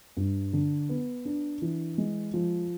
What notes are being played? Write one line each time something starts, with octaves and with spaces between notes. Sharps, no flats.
G2
D3
B3
D4
E3
G#3
F3